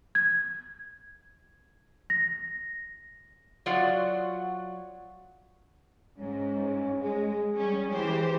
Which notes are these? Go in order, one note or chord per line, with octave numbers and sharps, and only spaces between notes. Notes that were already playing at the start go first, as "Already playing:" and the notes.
G#6
A#6
F#3 F4 F#4 D5 F#5
G#2 C#4
G#3 G#4
G3 C#4
E3 G4 C5